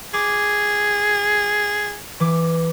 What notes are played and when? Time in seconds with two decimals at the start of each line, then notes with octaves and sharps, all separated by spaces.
0.14 G#4 D6
2.20 E3 D6